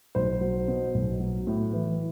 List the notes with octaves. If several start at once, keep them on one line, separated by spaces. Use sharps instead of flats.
B1 C5
F#3
B2
B1
F#3
A2
E3